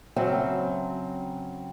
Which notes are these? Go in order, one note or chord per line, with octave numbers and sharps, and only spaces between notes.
C#3 F#3 C4 E5 F#5 G#5